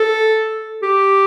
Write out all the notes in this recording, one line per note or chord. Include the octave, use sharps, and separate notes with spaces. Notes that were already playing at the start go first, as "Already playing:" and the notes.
Already playing: A4
G4